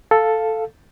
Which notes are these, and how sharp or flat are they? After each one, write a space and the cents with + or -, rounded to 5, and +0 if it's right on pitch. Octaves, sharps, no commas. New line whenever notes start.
A4 +0 F5 +0